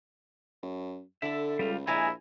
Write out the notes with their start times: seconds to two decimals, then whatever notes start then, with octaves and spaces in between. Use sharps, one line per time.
0.63 F#2
1.22 D3 E4 A4 E5
1.59 C#2 G3 F4
1.87 A#1 G3 G#3 E4 G#4 A#4 G#5 A#5